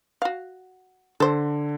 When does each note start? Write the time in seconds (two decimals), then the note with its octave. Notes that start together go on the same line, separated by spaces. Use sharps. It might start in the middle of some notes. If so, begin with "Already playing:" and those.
0.22 F#4 F5
1.20 D3 A4 C5